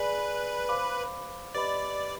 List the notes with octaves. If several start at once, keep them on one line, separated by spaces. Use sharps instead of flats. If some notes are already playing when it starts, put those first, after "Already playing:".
Already playing: G#4 B4 D5 G#5
C5 F5 B5 D6
G4 B4 D5 D#5 B5